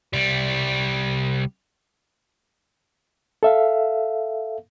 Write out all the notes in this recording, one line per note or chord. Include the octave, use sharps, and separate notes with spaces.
C2 G3
A4 E5 F5